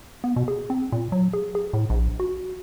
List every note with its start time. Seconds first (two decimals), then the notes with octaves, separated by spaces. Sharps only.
0.24 B3
0.36 B2
0.48 G#4
0.70 C4
0.92 A#2
1.12 F#3
1.33 G#4
1.55 G#4
1.73 A2
1.90 A#1
2.20 F#4